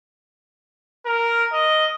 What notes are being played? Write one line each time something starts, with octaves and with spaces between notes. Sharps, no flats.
A#4
D#5